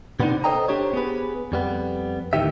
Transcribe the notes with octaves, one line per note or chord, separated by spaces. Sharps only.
C3 B3 C4 D4 D#4
A4 C5 C#5 D#5 G5 A#5
D4 G4 C5 C#5
B3 G4 G#4 B4
F2 G3 B3
D2 A2 D#3 G4 E5